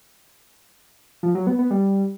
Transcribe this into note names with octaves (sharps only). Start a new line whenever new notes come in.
F3
F#3
B3
B3
G3